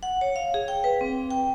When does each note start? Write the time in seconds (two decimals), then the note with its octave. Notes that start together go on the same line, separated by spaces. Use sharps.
0.03 F#5
0.21 C#5
0.36 F5
0.54 G#4
0.68 G5
0.84 B4
1.01 C4
1.31 G5